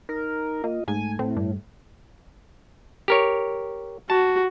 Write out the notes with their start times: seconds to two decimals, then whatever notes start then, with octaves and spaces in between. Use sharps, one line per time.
0.09 D#4 A#4
0.64 A#3 F4 D#5
0.88 G#2 A3 G#5
1.19 A2 C4
1.37 G2
3.08 G4 A#4 C#5
4.10 F#4 A5